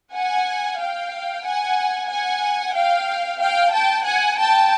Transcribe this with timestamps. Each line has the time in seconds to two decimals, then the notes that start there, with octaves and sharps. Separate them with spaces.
0.16 F#5 G#5
0.81 F5 G5
1.45 F#5 G#5
2.10 F#5 G#5
2.76 F5 G5
3.41 F5 G5
3.74 G5 A5
4.06 F#5 G#5
4.39 G5 A5